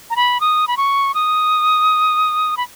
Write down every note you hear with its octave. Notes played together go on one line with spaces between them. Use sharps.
A#5
B5
D#6
B5
C#6
D#6
B5